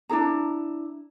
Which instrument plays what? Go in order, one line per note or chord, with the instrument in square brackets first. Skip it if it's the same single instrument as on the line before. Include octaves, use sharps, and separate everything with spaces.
[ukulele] D4 E4 G#4 A#5